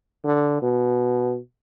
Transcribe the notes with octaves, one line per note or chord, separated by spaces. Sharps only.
D3
B2